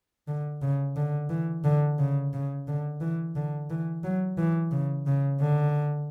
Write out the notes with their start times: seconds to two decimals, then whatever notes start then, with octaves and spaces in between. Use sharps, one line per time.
0.28 D3
0.62 C#3
0.97 D3
1.30 E3
1.64 D3
1.99 C#3
2.34 C#3
2.68 D3
3.01 E3
3.36 D3
3.70 E3
4.04 F#3
4.38 E3
4.72 C#3
5.07 C#3
5.41 D3